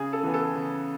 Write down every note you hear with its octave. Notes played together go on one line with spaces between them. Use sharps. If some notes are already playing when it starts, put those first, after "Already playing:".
Already playing: C#3 G#4
A4
E3 B3
A4
C#3